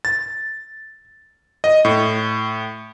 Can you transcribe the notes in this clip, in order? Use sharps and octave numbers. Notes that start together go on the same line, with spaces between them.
A6
D#5
A2